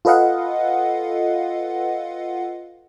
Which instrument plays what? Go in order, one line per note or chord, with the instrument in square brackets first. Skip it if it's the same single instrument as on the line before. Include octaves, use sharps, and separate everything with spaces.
[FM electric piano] F4 A4 B4 D#5 F5 F#5